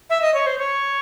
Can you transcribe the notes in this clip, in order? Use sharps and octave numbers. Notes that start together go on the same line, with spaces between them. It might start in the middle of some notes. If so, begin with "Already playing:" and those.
E5
D#5
C#5
C5
C#5